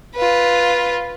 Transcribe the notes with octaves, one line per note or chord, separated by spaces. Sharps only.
F4 B4